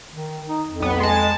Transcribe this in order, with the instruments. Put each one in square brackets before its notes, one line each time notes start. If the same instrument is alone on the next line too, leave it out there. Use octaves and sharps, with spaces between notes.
[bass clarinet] D#3
D#4
F2
[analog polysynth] B1 B3
G#3 A5